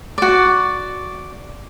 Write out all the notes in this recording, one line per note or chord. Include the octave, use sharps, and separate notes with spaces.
F#4 D5